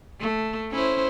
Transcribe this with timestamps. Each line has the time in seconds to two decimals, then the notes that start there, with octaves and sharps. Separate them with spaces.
0.20 A3
0.71 C#4 E4 C5